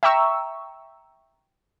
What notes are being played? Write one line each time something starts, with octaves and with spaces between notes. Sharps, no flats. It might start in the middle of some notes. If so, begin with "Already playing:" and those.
E5 G5 A#5 C#6 E6